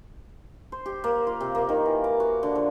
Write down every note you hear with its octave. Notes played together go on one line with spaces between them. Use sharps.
C5
G4
A#3
F4
C3
A#3
D#3
E3
D6
F#4
D3
F3